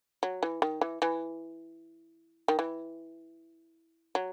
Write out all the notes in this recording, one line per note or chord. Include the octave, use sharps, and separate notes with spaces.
F#3
E3
D#3
E3
E3
D#3
E3
F#3